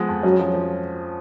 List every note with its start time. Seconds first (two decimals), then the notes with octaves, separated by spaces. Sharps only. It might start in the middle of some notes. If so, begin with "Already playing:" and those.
Already playing: F3 G#3 B3
0.09 F2
0.23 F#3 C#4
0.39 F3
0.54 F3